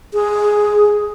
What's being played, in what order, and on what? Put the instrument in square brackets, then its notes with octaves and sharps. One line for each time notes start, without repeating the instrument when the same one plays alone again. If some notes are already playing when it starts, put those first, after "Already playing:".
[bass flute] G#4